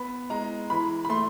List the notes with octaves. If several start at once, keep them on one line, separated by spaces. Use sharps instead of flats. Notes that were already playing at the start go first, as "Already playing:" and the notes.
Already playing: B3 B5
G#3 A#5
E3 B5
B5
A3 C6